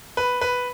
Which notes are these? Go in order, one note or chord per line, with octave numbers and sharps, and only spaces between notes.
B4
B4